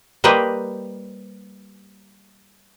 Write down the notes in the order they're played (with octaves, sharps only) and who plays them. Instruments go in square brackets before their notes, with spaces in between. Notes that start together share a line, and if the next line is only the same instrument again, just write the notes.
[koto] G3 A#3 B4 C5 D#5 G5